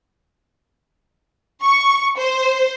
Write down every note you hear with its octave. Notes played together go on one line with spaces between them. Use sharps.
C#6
C5